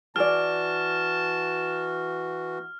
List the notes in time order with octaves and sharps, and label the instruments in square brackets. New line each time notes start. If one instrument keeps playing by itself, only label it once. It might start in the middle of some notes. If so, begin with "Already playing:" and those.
[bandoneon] E3 F#4 [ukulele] G#4 D5 [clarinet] A5 [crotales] F6